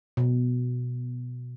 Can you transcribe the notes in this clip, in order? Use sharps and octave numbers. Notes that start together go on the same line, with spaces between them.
B2